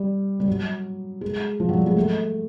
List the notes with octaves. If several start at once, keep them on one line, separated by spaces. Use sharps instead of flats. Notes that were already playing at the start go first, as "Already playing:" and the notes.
Already playing: G3
G3
F#3
G#3
F3
F#3
G3
G#3
A3